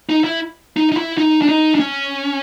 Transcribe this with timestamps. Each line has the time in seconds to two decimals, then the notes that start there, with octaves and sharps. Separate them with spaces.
0.09 D#4
0.24 E4
0.77 D#4
0.92 D#4
0.97 E4
1.18 D#4
1.42 D4
1.49 D#4
1.75 D4
1.80 C#4